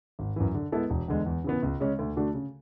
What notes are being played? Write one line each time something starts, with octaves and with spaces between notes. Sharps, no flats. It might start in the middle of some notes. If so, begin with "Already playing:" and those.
G#1
F#2 E3
D3
G#3 B3 E4 A4
E1
E2 D3 G#3
E2
C#3 E3 B3
C#2
C#3 G#3 C#4
D2
D3 A3 D4 F#4
C#3